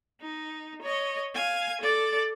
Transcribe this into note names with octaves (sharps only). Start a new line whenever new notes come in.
D#4
C#5 D#5
F5 G#5
A4 D5